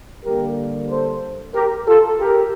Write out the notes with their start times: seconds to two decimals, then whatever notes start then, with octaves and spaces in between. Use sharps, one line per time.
0.25 D3 G3 A#3 G4 A#4
0.90 A4 C5
1.55 G4 A#4
1.88 F4 A4
2.20 G4 A#4